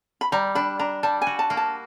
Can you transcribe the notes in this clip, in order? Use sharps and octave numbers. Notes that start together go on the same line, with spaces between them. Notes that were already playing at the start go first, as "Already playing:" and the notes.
B5
G3 A#5
D4 B5
D4 A#5
G3 A5
G#5
F#4
A5
A#3
A5